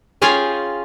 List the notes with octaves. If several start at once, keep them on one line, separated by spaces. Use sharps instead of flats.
C#4 F4 G#4 F5 G5 G#5